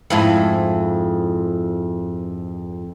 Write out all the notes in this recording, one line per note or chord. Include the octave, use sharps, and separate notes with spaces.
F2 G#2 E4